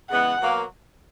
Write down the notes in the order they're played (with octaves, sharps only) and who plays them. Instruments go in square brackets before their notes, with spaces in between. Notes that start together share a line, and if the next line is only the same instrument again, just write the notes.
[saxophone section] C#3 E3 G#3 B3 [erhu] F#5
[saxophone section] B2 F#3 A#3